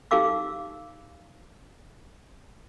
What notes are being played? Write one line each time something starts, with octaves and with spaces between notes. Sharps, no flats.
D#4 G4 A4 F5 D6 E6